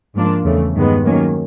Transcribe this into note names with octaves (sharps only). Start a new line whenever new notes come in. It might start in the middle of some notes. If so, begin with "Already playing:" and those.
G#2 F3 A#3 D4 F4
E2 C#3 E3 A3
G2 D#3 G#3 B3
D#3 F#3 A#3 C#4